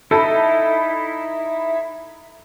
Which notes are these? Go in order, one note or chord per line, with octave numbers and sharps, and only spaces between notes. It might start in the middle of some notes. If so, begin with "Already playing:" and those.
D#4 E4 A4 B5